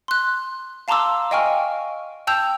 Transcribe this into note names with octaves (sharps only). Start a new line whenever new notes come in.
C6 F#6
F5 A5 A#5 C6 D6 E6
D#5 F5 G5 G#5 C#6 F6
G5 A5 E6 G6 F7